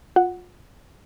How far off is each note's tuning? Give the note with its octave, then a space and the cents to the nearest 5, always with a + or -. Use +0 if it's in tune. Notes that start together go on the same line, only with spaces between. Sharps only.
F4 +30 F#5 +0